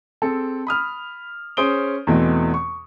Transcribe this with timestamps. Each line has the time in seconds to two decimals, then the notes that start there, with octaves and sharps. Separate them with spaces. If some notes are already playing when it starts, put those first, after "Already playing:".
0.22 C4 G#4 A4
0.67 B5 D#6 F6
1.57 C#4 G#4 C5 D#6 D7 G7
2.07 E2 B2 E3 A3 C4 D#5
2.54 C#6